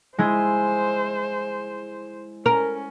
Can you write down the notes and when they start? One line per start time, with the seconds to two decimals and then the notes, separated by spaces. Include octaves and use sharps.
0.18 G#3 E4 G#4 C5
2.46 C#4 A#4